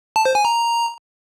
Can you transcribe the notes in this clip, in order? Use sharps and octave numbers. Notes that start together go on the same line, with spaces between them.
A5
C5
G#5
A#5